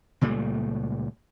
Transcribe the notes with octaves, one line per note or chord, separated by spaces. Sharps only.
C#2 A#2 G3 A3